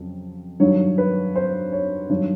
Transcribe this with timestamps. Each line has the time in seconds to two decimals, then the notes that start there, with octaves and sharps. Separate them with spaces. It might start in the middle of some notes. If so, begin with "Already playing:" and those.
Already playing: F2 C#3 F#3
0.60 G2 D#3 F#3 C#5
0.98 B4
1.36 C5
1.72 C#5
2.09 G2 D#3 F#3 C#5